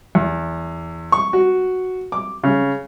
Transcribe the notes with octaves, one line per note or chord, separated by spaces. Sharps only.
E2
C#6
F#4
D6
C#3